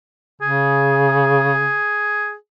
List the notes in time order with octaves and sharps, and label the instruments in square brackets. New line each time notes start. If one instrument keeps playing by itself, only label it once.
[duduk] C#3 [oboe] G#4